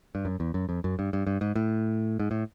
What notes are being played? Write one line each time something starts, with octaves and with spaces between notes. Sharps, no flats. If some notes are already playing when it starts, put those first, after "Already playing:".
G2
F#2
E2
F#2
F2
F#2
G2
G2
G2
G#2
A2
G#2
A2